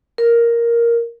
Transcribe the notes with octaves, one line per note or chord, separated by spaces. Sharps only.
A#4